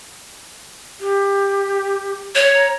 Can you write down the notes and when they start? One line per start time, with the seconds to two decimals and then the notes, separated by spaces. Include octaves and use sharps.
1.01 G4
2.35 C#5
2.55 A#5